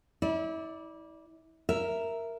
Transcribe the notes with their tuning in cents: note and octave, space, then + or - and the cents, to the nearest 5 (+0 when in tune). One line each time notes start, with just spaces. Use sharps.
E4 -35 D5 +0
A#4 -5 E5 +5